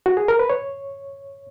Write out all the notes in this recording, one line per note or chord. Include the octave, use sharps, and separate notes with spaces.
F#4
G#4
A#4
B4
C#5